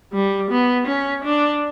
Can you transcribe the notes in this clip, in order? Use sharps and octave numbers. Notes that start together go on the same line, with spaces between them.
G3
B3
C#4
D4